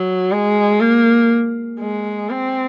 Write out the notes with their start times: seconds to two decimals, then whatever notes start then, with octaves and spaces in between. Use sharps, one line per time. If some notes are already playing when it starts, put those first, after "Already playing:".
Already playing: F#3
0.31 G#3
0.81 A#3
1.80 G#3
2.30 C4